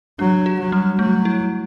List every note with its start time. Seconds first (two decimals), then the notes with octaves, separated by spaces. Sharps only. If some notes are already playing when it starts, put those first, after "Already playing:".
0.19 F#3 D4
0.46 F#4
0.59 F#3
0.72 G3
0.99 F#3 A3
1.25 E4